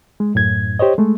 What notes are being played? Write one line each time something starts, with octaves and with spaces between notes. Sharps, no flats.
G#3
F#2 A2 G#6
G4 C5 C#5 D#5
G#3 A3